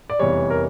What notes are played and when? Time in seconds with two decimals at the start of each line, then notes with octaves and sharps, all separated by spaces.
0.10 D5
0.19 F1 E2 E3 G3 C#5
0.50 A#4